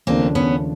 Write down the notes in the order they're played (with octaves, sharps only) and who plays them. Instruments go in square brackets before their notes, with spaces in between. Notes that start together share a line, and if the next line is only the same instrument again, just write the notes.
[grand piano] D#2 C#3 F3 A3 D4 [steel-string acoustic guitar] A#3 C4
[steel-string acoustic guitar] B3 C#4